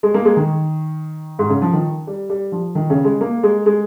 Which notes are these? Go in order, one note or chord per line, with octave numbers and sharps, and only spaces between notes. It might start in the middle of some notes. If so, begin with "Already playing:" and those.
G#3
A#3
G#3
D#3
G#2
C#3
F3
D#3
G3
G3
F3
D#3
C#3
G#3
A#3
G#3
G#3